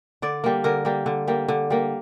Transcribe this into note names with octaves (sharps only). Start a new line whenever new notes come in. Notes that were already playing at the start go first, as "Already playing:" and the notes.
D3 D5
G3 A#3
D3 A#4
G3 A#3
D3
G3 A#3
D3
G3 A#3